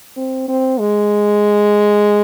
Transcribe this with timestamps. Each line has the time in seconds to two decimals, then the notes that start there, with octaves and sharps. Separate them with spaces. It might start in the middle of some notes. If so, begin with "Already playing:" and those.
0.16 C4
0.48 C4
0.79 G#3